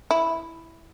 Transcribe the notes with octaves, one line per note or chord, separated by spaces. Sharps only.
E4